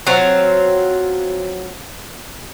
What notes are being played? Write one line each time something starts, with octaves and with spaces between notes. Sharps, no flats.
F#3 C4 F4